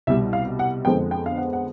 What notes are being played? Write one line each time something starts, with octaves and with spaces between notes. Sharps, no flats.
C2 B2 G3 E5
F5
F#5
F2 D3 F3 G#3 B3 G5
G5
F5
F#5
F#5